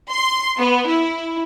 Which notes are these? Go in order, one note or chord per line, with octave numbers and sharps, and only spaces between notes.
C6
B3
E4